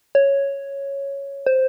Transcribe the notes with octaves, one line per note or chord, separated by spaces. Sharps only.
C#5
C5